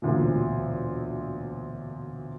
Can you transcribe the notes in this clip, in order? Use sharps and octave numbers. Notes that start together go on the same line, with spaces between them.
E1 D2 A#2